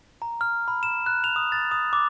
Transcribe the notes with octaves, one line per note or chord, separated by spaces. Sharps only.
A#5
F6
B5
E7
F#6
F7
D#6
A6
D#6
D6